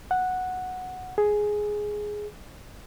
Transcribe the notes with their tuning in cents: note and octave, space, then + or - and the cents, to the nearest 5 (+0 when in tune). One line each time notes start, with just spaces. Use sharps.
F#5 -5
G#4 +5